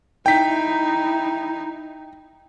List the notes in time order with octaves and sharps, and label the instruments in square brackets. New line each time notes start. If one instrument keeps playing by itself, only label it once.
[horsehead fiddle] D#4 E4 [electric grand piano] G5 B6